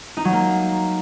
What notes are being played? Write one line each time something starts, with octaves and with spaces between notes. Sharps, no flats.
D#4
F#3
A#3